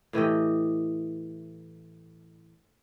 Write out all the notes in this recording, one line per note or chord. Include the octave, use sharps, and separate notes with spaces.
A2 E3 G4 D#5